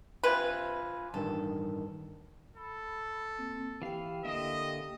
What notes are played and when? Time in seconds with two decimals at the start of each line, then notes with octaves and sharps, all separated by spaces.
0.24 C3 F4 B4 G#5 B5
1.14 A1 G2 D#3 A4
2.56 A4 B5
3.38 A#3 C4
3.82 E3 G4 F5 G5
4.25 D3 A#3 D#5 E5